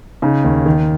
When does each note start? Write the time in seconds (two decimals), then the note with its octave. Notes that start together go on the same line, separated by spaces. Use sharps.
0.22 C#3 D#4
0.44 D#2
0.66 D#3